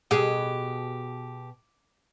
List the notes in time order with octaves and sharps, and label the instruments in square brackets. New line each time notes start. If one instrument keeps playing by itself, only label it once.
[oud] B2 G#4 [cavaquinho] G4